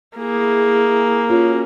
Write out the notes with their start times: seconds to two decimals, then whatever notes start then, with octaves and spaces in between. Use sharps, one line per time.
0.18 A#3 E4 G#4
1.30 C#4 F4 F#4 G#4